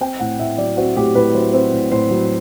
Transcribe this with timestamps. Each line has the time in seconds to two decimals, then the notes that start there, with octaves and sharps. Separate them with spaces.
0.01 C4 G5
0.20 A2 F#5
0.39 A2 E5
0.58 F#3 D5
0.77 C4 F#4
0.96 A2 G4
1.15 A2 B4
1.34 F#3 C5
1.54 C4
1.73 A2
1.92 A2 C5
2.10 F#3